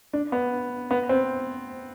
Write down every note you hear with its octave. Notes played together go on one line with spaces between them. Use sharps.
D4
B3
B3
C4